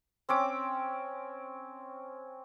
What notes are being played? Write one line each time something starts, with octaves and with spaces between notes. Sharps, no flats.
C4 C#4 D6